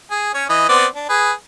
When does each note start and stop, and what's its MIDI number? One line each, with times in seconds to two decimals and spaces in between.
0.11 0.32 68
0.34 0.45 61
0.34 0.45 73
0.50 0.67 52
0.50 0.67 75
0.69 0.86 59
0.69 0.86 60
0.69 0.86 74
0.96 1.06 62
1.09 1.32 68
1.09 1.32 71